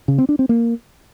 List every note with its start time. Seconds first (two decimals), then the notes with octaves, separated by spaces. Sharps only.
0.08 C#3
0.18 C4
0.29 D4
0.39 C4
0.49 A#3